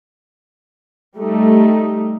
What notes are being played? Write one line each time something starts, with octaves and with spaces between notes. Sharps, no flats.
G3 A3 D#4